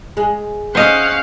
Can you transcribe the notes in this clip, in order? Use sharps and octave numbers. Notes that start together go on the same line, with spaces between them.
G#3
C#4 C5 D#5 F5 F#5